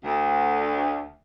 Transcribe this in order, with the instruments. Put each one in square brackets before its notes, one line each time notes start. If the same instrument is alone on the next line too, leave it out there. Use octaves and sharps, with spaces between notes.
[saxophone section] D2